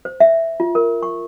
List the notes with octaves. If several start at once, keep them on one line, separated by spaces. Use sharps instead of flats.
C5
E5
F4
A#4
C#6